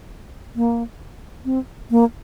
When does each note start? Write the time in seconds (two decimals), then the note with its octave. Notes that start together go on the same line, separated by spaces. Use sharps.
0.56 A#3
1.45 C4
1.91 A#3